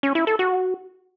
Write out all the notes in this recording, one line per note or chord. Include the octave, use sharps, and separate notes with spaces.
C#4
E4
A4
F#4